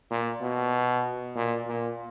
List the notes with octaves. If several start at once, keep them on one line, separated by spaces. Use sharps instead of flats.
A#2
B2
A#2
A#2